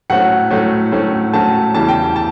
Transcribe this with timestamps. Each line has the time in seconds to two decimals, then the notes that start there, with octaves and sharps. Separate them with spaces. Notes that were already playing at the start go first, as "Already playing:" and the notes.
0.10 A2 F#3 A3 C#4 F#5
0.51 A2 F#3 A3 C#4
0.92 A2 F#3 A3 C#4
1.33 A2 F#3 A3 C#4 A5
1.74 E2 C#3 E3 G3 A5
1.88 G5
2.16 A5